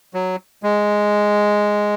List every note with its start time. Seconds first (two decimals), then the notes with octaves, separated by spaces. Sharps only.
0.14 F#3
0.63 G#3